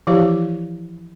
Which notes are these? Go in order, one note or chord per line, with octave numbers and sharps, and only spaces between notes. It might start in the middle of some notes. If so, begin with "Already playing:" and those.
E3 F3 E4 G4 C5 F5